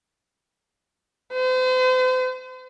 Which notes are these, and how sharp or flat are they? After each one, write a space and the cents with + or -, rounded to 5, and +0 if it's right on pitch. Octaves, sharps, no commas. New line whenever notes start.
C5 -40